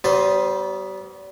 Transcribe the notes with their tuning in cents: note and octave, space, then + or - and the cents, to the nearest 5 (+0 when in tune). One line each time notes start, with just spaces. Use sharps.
G3 -40 B3 +5 C5 +0